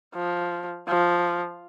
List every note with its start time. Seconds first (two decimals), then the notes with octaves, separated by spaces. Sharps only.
0.14 F3
0.88 F3